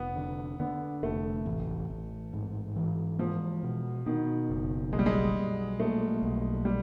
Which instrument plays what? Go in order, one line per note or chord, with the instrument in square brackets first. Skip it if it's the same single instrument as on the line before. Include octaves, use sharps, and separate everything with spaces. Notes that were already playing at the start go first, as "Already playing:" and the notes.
Already playing: [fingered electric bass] F1 [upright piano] B3
[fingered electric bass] D3
[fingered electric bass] D3 [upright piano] B3
[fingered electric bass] F1 [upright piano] A3
[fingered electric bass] A1
A1
G#2
E3
[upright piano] F3 [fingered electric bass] G#3
[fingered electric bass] B2
[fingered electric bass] B2 [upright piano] D#3
[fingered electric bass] F#1
[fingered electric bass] B1 [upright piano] G#3
[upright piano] G3
G#3
[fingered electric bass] B1
[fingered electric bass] A#2 [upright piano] A3
[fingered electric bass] B1
[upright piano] G3